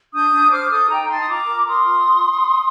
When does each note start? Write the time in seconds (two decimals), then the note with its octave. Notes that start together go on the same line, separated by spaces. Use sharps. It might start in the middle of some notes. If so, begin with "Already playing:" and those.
0.13 D4 D#6 G6
0.32 D4
0.51 C5 D6 F6
0.70 A4 D#6 G6
0.90 D#4 G5 A#5
1.10 D#4 A5 C6
1.21 D#6
1.28 F4 A#5 D6
1.47 A#4
1.66 A#4 C6 D#6
1.86 F4